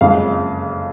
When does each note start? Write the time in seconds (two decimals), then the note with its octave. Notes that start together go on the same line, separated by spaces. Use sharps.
0.01 F#1 F2 C#3 G#3 F5